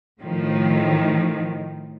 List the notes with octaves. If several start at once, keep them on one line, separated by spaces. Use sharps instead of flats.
A2 D#3 F3